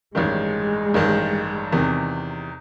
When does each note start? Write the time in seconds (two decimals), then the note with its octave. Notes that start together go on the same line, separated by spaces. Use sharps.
0.15 A1 G2 D#3 G#3
0.94 A1 G2 D#3
1.72 E2 C3 D#3